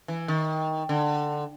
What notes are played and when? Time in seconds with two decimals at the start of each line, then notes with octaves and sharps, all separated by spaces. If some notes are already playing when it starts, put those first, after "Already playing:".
0.08 E3
0.28 D#3
0.89 D3